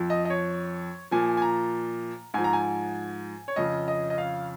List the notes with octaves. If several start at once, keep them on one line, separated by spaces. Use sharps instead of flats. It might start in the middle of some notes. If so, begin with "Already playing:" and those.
Already playing: F2 F3
D#5
D#5
C#5
A#2 F3 G#5
G#5
A#5
G#2 F3 G#5
A#5
G#5
C#5
F2 C#3 F3 D#5
D#5
D#5
F5